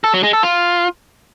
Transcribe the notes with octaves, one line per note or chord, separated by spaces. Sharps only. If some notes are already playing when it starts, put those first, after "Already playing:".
A4
F#3
G#3
A4
F4